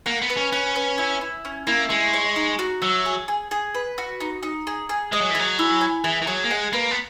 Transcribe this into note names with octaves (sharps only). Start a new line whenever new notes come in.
A#3 F#5
B3
B4
C#4
C#4 F#5
B4
E4
E4
C#4
A#3 E4
G#3 C#5
C#5
D#4
F#4
F#3 E5
G#4
G#4
G#4
B4
F#4
D#4
D#4
G#4
G#4
G#3 D#5
F#3
E3
F#3 G#4
E4
G#5
E3 G#4
E3
F#3 G#4
A#3
G#3 F#5
A#3 B4
B3